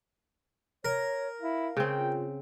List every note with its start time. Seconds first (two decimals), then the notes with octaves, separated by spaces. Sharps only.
0.85 A#4 C#5
1.41 E4 F5
1.77 C#3 C4 G5
1.98 F4